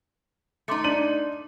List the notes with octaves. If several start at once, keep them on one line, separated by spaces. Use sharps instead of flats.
A3 D#4 C6 D6 C#7
D4 D5 D#7 F#7